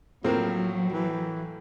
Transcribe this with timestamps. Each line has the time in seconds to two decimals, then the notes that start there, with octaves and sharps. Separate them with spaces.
0.24 A2 F3 F#3 A#3 C4 A#4
0.92 E3